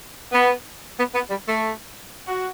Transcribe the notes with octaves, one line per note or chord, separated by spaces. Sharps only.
B3
B3
B3
G3
A3
F#4